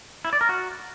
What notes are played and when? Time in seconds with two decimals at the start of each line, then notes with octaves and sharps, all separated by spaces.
0.25 E4
0.33 D5
0.41 A#4
0.49 F#4